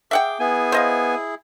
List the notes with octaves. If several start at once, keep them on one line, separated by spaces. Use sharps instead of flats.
G#4 E5 F#5 G5 D6
B3 E4 G#4 G#5
C5 D#5 F5